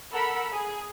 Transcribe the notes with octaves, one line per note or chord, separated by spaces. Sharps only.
A4 A#4 F#5 B5 E6
G#4